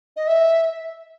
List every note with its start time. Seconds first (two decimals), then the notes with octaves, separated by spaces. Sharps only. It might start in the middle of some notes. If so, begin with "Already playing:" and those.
0.16 D#5
0.27 E5